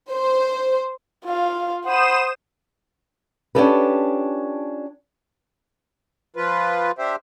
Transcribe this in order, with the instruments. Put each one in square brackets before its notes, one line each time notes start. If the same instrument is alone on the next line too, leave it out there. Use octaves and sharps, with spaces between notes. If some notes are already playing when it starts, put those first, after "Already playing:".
[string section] C5
[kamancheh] F4 F5
[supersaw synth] C5 D#6 E7 [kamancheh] F#5 B5
[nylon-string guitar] C#4 D4 F4 G4 A4 B4
[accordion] F3 F4 B4
D4 G4 C5 E5